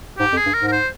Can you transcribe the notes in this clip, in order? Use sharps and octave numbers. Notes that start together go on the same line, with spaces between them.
G#2 G4
F2
G#4
G2
G#2 A#4
A#4
C5